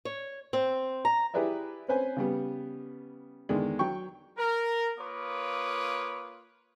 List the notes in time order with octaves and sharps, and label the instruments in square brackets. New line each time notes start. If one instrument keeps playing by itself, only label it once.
[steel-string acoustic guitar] C#5
C4
A#5
[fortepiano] E4 G4 G#4 B4 D5 E5
C4 C#4 B4 C5 G#5
C#3 G3 B3
E2 D3 D#3 G#3 D4
F#3 G5 C#6
[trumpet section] A#4
A#3 F4 B4 C#5 D6 D#6